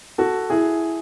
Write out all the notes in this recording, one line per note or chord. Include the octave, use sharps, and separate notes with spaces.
F#4 A4
E4 G#4